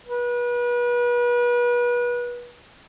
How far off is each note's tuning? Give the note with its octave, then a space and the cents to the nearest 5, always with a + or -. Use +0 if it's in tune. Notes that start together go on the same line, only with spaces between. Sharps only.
B4 -35